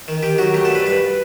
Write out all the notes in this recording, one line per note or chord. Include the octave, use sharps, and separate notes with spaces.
D#3
D#3 G4
F#3 F#4
A3 G4
A4
G2 B4
G2 B4